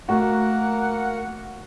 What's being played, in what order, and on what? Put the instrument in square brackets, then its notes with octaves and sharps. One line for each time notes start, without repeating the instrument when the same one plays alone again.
[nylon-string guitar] A3 [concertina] A#3 A#4 [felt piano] F#4 [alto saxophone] F#5